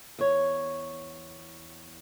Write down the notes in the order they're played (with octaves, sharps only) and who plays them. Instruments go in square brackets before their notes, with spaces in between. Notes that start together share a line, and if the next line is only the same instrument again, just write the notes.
[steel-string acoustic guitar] E2 C#5